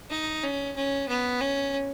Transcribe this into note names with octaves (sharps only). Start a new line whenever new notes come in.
D#4
C#4
C#4
B3
C#4